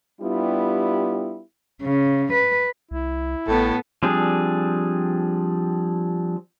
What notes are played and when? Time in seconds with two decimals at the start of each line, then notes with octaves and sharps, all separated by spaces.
0.21 G3 B3 D4 E4 F4 G4
1.82 C#3
2.33 B4
2.91 C2 E4
3.48 A1 A2 B3 A4
4.03 F3 G3 C4 D4 G#4